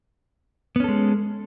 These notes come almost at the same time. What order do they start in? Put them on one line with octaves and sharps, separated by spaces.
B3 C#4 A4 G#3